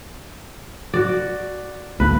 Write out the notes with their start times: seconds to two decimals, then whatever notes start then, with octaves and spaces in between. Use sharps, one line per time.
0.94 F#4 D5
2.00 D2 A#3 B4